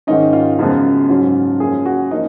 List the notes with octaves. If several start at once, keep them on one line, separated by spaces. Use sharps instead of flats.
G#2 D#3 G#3 C#4 D#4
F4
F#2 C#3 F3 G#3 B3
G#2 F#3 C#4
F#2 F3 A#3 C#4 G#4
F#4
F3 A#3 C#4 D#4